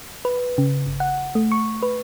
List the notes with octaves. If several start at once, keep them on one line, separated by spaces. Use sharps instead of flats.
B4
C#3
G1
F#5
A3
C#6
B4